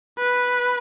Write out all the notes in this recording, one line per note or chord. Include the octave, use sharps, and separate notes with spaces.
B4